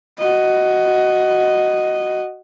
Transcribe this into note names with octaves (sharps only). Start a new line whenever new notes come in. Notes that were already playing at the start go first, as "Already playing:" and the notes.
F#4 D#5